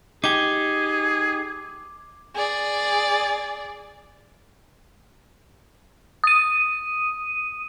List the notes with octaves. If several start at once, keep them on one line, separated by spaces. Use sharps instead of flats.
D#4 G4 G#4 D6
G#4 D5
D#6 D#7